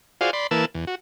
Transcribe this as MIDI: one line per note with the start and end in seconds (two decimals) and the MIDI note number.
0.21 0.31 65
0.21 0.31 66
0.21 0.31 68
0.21 0.31 72
0.21 0.31 74
0.21 0.31 77
0.33 0.47 74
0.33 0.47 83
0.33 0.47 84
0.51 0.65 52
0.51 0.65 58
0.51 0.65 71
0.51 0.65 81
0.51 0.65 88
0.75 0.85 40
0.87 0.95 66